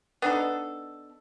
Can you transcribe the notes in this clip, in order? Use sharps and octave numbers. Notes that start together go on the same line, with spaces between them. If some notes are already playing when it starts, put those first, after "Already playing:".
B3 D4 D#4 A4